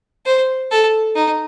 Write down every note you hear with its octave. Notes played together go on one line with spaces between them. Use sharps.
C5
A4
D#4